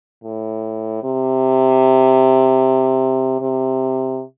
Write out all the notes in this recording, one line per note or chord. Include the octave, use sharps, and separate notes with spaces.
A2
C3
C3